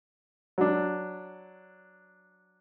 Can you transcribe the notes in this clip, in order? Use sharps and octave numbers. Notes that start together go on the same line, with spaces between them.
F#3 D4